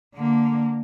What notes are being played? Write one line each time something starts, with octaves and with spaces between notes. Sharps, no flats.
D3 A#3